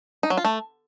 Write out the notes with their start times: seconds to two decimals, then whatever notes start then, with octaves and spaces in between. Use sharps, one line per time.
0.23 D#4
0.30 F#3
0.37 F4
0.45 A3